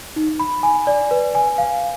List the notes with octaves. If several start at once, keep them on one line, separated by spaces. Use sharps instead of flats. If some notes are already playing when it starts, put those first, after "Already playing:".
D#4
B5
G#5
D5
B4
G#5
F5